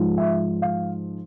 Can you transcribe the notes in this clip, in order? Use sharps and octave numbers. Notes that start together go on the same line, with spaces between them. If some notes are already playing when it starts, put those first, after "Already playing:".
Already playing: G#2 F3 G#3
E5
F5